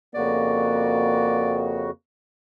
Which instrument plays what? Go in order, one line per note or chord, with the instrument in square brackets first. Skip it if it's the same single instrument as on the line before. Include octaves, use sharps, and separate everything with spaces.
[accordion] F2 C#3 F#4 [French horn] A#3 [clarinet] D5